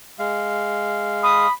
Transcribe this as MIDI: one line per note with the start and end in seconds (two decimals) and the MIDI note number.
0.19 1.47 56
0.19 1.47 77
1.23 1.53 83
1.23 1.49 87